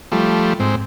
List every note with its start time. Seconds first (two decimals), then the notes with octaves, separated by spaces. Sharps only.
0.12 F3 G3 A3
0.60 G#2 C4